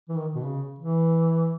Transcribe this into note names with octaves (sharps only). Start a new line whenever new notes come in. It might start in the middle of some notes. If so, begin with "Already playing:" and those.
E3
D#3
B2
C#3
E3